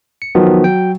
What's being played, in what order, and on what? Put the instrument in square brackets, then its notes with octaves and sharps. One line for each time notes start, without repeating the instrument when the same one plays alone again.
[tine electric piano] C#7
[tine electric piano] D#3 F3 B3 [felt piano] F#3
[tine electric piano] G5